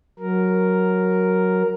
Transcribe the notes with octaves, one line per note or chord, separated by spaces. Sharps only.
F#3 A#4